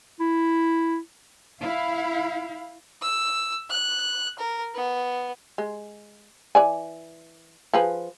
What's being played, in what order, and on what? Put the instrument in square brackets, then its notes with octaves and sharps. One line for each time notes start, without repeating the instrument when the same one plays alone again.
[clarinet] E4
[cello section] E4 F5
[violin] E6
F#6
A#4
B3
[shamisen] G#3
E3 D5 G#5
F3 G#4 B4